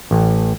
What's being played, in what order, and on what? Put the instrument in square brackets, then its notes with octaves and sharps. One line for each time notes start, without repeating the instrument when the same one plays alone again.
[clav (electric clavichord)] A1